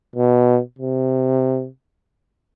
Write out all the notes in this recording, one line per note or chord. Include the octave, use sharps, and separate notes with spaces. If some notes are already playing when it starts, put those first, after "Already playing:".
B2
C3